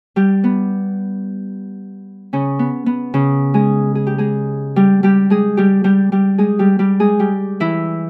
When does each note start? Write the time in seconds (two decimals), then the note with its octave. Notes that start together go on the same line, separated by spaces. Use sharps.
0.16 G3 G4
0.44 B3
2.33 C#3 C#4
2.59 B3
2.86 B3
3.14 C#3 C#4
3.54 G#3 G#4
3.95 G#4
4.07 G4
4.18 G#3 G#4
4.76 G3 G4
5.03 G3 G4
5.30 G#3 G#4
5.57 G3 G4
5.84 G3 G4
6.12 G3 G4
6.38 G#3 G#4
6.59 G3 G4
6.79 G3 G4
7.00 G#3 G#4
7.19 G3 G4
7.60 E3 E4